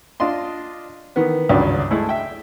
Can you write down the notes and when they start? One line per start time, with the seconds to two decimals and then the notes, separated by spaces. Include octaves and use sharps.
0.20 D4 F4 D#5 C6
1.16 D#3 E3 B3
1.49 G#1 C#2 G2 D3 F#3 D5
1.91 G#3 A3 E4 G#4 A4
2.09 E5 G5